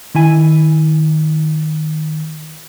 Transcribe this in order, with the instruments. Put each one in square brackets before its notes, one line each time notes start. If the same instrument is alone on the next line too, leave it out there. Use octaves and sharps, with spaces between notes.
[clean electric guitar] D#3 E4 G#5